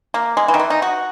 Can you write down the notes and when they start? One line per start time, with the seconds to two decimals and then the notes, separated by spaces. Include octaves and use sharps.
0.14 A#3
0.37 G#3
0.48 E3
0.54 D#3
0.59 E3
0.70 D#4
0.82 F#4